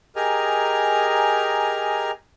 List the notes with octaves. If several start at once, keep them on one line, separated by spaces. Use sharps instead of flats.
G4 G#4 A#4 D#5 G#5 A#5